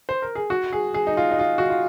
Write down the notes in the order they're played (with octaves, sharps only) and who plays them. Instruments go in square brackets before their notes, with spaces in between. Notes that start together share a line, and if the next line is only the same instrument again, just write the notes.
[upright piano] C5
A#4
G#4
F#4
G#4
G#4
D#4
F4
D#4
F4
F#4
F4